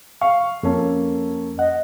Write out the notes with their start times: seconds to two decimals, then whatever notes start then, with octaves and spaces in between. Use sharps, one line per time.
0.21 F5 C#6
0.63 F2 A#3 C#4 A4
1.59 D#5 F#5